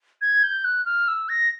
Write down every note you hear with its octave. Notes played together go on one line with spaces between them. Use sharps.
G#6
G6
F#6
F6
E6
A#6